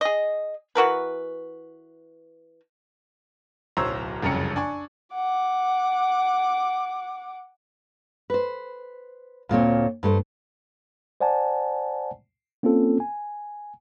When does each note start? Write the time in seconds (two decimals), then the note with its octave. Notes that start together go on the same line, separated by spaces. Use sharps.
0.01 G#4 D#5
0.75 E3 F#4 A#4 B4
3.77 D1 B1 C5 C#5 A#5 E6
4.23 F#1 C2 F2 C#3 A#5 C#7
4.56 D4 G#5 C#6
5.14 F#5 D6
8.30 B4 C5
9.49 D2 A#2 C4 C#5
10.03 G2 A3 B4 C5
11.21 C5 D5 F#5 G#5 A5
12.63 A#3 C4 C#4 F4 A4
13.00 G#5